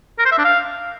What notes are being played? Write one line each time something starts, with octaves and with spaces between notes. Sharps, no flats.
A#4
C5
E5
D4
F5